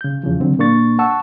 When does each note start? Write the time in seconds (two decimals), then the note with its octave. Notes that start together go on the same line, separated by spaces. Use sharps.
0.01 C#3 G6
0.23 E2 C#3 E3 F3
0.40 D3 F#3 C4 D4
0.59 A#2 A#3 D4 C#6 A6
0.99 F#5 A5 C#6 E6